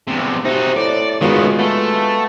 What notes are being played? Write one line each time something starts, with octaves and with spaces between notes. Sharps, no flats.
E2 C3
C3 D#4 F#4
A2 D5
C#2 D#3 G#3 B3 F4 F#4
A3 B3